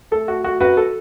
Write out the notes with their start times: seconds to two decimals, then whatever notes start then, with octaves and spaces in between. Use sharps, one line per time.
0.11 A3 A4
0.28 A3 F#4
0.44 A3 F#4
0.60 F#2 F#4 B4
0.77 A4